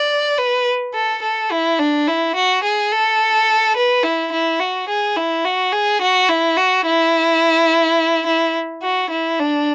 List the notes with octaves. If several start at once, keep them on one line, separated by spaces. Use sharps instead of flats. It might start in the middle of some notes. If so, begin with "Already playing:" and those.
Already playing: D5
B4
A4
A4
E4
D4
E4
F#4
G#4
A4
B4
E4
E4
F#4
G#4
E4
F#4
G#4
F#4
E4
F#4
E4
E4
F#4
E4
D4